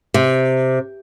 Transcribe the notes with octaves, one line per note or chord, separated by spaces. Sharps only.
C3